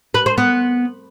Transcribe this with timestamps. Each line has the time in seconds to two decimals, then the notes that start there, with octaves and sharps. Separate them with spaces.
0.14 B4
0.26 C5
0.38 B3